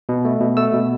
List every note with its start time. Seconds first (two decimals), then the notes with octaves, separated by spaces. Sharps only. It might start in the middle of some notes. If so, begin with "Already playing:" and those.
0.09 B2
0.25 A3
0.40 B2
0.57 A3 E6
0.73 B2